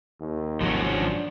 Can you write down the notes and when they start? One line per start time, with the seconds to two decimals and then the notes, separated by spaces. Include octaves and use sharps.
0.20 D#2
0.61 G#1 G2 C3 F3 F#3 C#4
0.95 D4